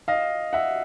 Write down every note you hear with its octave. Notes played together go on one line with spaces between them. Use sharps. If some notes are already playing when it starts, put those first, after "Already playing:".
D#5 F5
E5 F#5